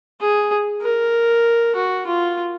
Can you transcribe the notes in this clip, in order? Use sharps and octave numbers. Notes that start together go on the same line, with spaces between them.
G#4
A#4
F#4
F4